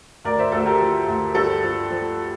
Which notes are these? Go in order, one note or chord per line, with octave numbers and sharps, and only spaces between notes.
D2 A#4 D5
C5 E5
D2 A4
G4 A#4
F3
D2
G2 A4
F3
F3